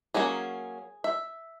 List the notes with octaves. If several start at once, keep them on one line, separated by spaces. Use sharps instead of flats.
F#3 A#3 C#4 G#4
E5